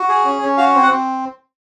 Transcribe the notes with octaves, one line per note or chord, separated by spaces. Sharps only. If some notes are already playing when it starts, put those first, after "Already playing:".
Already playing: F#4
G#4
C#4
C#4
F#4 F5
C4
F#5
C4